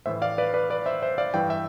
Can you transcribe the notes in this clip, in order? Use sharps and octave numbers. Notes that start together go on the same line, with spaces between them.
A2 E3 C5 E5
D5 F5
B4 D5
B4 D5
B4 D5
C5 E5
C5 E5
D5 F5
G2 E3 G5
E5 G5